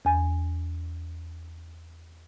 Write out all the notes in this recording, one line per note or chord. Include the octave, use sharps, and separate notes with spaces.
E2 G#5